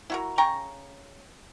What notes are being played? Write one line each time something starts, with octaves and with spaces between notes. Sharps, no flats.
E4 F#4 A#4
C#3 G5 A#5 C#6